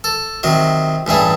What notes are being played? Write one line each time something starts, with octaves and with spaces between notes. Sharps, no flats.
A4
C3 D#3 F#3
A1 G2 A3 G#4